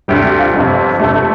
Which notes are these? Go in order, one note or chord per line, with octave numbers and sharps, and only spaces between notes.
D2 C3 G3 G4
G4
F4
G1 F2 C3
G1 F2 C3 A3
A3